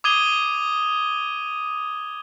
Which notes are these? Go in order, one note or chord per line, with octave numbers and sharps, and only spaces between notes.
D6 D#6 G#6 D#7 G7